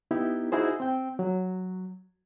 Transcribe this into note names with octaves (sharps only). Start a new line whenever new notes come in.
B3 D#4 E4 G4
D#4 E4 F#4 G#4 C5
C4 G5
F#3